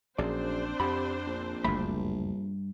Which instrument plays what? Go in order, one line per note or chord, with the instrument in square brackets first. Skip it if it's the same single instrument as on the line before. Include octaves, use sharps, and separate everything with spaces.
[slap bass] A#1 [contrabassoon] F#2 [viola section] C4 D4 C5 [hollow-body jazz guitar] G#4 D5
[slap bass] F2 [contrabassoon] C3 [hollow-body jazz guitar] F#5 B5
[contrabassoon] A#1
[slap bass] F#1 D2 A3 [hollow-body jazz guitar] G2 E5 B5